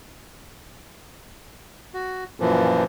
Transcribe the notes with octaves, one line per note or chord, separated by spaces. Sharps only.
F#4
F#2 A#2 E3 F3